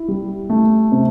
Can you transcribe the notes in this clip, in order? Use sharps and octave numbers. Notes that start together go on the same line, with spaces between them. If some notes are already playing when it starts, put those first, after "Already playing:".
Already playing: E4
G3
A3
C3